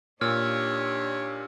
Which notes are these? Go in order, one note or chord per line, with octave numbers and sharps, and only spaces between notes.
A#2 D4 D#4 G4 C#5 E6 F6